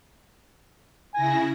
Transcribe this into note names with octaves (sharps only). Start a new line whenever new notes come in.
C#3 E4 G#5 A#6